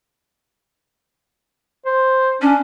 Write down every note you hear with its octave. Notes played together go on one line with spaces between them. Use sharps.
C5
C#4 D4